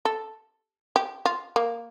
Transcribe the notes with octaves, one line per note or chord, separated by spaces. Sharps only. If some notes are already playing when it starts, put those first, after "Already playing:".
A4
G4
F4
A#3